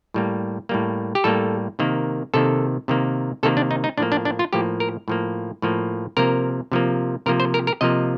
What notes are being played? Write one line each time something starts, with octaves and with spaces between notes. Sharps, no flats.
A2 G3 A#3
A2 G3 A#3
G4
A2 G3 A#3 A4
C3 D#3 A#3
C3 D#3 A#3 A4
C3 D#3 A#3
C3 D#3 A#3 A4
D4
D#4
D#4
A2 F3 A#3 D4
D4
D4
F4
A2 F3 A#3 G4
A#4
A2 F3 A#3
A2 F3 A#3
C3 F3 A#3 A#4
C3 F3 A#3
C3 F3 A#3 A#4
C5
A#4
A#4
C3 F3 A#3 D#5